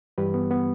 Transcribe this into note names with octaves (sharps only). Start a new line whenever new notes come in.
G2 E3 G3 G4 B4
B3
B3